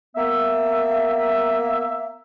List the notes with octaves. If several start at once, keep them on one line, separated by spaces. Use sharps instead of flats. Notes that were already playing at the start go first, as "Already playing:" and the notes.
A#3 B3 E5